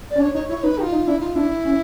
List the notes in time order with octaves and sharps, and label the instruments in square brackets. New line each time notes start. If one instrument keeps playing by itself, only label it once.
[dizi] D5
[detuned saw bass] C#4
[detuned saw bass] D4 [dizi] C#5
[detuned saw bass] D#4 [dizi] C#5
[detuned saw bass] E4 [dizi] C#5
[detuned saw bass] D#4 [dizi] B4
[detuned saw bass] D#4 [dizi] G4
[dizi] F4
[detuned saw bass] D#4
[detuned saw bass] D4 [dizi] E4
[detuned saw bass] D#4 [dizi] F4
[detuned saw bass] D4 [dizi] E4
[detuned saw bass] C#4